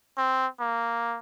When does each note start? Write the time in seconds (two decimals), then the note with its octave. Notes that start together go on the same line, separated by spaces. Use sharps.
0.17 C4
0.60 A#3